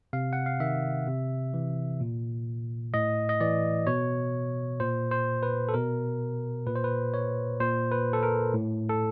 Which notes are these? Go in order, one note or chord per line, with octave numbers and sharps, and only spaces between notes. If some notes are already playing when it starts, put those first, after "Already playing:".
C3 F5
F#5
F5
D#3 E5
C3
E3
A#2
A2 D#5
D#5
E3 D5
B2 C#5
A#2 C5
C5
B4
A4
B2 A#4
A#2 B4
C5
B4
C#5
A#2 C5
B4
A4
A#4
A2
A4